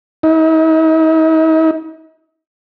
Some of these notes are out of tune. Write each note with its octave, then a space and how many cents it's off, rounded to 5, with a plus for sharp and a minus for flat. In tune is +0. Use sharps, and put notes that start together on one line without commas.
D#4 +45